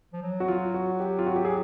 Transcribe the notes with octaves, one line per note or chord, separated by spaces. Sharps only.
F3
F#3
F#4
F4
F#4
G4
F4
F#4
G4
G#4